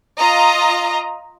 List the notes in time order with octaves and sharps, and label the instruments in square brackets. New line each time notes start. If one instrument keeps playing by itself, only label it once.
[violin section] F4 D#5 A#5